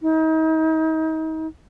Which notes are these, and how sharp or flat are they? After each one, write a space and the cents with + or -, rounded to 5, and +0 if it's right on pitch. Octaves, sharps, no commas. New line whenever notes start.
D#4 +35